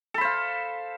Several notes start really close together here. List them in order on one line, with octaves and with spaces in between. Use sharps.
A4 B5 C5 F5